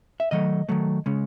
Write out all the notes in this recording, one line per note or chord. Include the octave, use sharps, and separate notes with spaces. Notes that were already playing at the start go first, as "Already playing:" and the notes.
E5
D#3 F#3 A3 D#5
D#3 F#3 A3
C#3 G#3 C#4